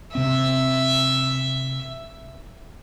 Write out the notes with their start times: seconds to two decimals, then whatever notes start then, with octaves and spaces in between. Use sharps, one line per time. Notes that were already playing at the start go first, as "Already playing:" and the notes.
0.15 C3 C4 E5